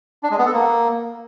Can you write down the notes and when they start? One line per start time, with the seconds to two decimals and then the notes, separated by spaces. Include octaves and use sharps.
0.23 D4
0.31 G#3
0.38 B3
0.46 A4
0.53 A#3